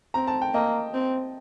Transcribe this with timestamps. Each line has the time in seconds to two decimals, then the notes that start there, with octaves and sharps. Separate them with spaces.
0.14 C4 A#5
0.27 A5
0.42 G5
0.54 A#3 D#5
0.94 C4